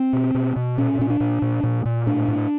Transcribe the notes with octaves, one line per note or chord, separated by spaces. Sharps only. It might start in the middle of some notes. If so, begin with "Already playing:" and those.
Already playing: C4
B2
B2
B2
A#2 C#4
A#2 C#4
D4
A#2
A#2
A#2
A#2
A2 D4
A2